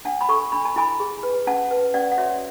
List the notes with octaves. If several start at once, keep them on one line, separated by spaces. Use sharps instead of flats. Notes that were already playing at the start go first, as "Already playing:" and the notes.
D4 F#5 A5
B5
A4 A5 C#6
D4 B5
A5
E4 G#5 B5
G#4
B4
C#4 F#5 A5
B4
C#4 D5 F#5
F#5
F#4 C#5 E5